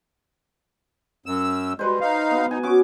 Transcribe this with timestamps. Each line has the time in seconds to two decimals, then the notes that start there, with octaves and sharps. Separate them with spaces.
1.26 F#2 E6
1.79 G3 G#3 B4 C5
2.01 D#4 F5
2.31 B3
2.51 D#4 G#5
2.63 C#4 F#4 D6